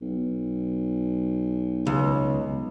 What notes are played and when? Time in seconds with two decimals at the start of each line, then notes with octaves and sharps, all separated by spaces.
0.01 B1
1.87 C#2